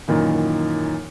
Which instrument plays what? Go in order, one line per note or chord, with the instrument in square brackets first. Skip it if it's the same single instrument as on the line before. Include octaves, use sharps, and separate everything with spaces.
[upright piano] F#2 A#2 D#3 E3